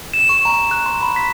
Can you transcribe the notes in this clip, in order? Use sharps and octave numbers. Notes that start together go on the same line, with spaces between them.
E7
C#6
A#5
F#6
C6
B5
B6